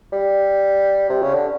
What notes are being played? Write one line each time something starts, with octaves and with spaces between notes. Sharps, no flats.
G3
C3
C#3
D3